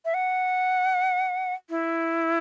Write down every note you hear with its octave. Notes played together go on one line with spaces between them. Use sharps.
E5
F#5
E4